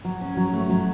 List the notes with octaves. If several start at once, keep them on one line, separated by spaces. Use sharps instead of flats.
F#3
C#4
F#3
A3
F#3